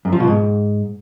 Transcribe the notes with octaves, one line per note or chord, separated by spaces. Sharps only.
F#2
F3
B2
G#2